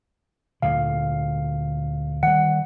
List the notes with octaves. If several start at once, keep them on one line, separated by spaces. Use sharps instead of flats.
D2 A#2 D3 F5
D#3 G3 F#5